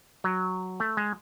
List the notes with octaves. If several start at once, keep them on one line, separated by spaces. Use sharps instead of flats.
F#3
A3
G#3